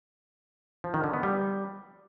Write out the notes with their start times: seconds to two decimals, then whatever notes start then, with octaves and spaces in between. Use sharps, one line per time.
0.84 F3
0.94 D#3
1.04 D3
1.14 B3
1.23 G3